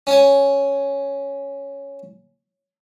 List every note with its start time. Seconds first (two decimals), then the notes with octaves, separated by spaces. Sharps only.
0.07 C#4 G#5